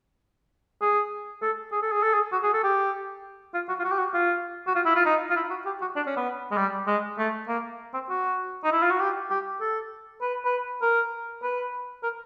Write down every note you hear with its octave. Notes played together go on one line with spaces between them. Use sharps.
G#4
A4
G#4
A4
G#4
A4
G#4
F#4
G#4
A4
G4
F4
F#4
F4
F#4
G4
F#4
F4
F#4
F4
E4
F4
D#4
F4
E4
F#4
G4
F#4
D4
C#4
B3
G#3
G3
G#3
A3
A#3
C4
F#4
D#4
E4
F4
F#4
G4
G4
A4
B4
B4
A#4
B4
A#4